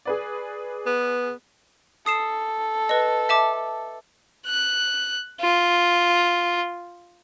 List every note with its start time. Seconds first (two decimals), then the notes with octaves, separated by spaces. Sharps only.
0.05 G#4 B4 D5
0.86 B3
2.06 A4 D#6 C7 E7
2.89 B4 D#5
3.29 E5 A5 D6
4.47 F#6
5.41 F4